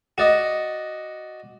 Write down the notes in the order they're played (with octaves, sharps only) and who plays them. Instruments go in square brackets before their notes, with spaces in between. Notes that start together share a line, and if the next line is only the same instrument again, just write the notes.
[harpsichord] F#4 D5 D#5